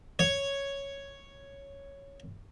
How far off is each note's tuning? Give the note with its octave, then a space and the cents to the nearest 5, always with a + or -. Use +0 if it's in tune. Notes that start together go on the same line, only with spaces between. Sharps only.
C#5 +0